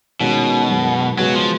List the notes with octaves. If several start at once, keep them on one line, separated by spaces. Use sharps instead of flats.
B2 D#3 G#3 C#4 F#4
F#2 D#3 G#3
C#3 F#3 G#3 B3 F#4
F3